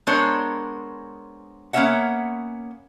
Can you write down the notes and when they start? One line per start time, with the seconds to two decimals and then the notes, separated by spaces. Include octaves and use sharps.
0.07 G#3 B3 D4 A#4 C5 C#5
1.73 A#3 B3 C#4 C#5 E5 F#5